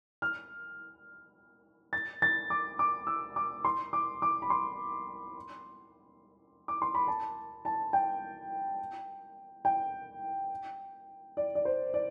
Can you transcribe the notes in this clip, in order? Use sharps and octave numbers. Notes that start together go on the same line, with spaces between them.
F6
A6
A6
D6
D6
E6
D6
C6
D6
D6
B5
C6
D6
C6
B5
A5
A5
G5
G5
D5
D5
C5
D5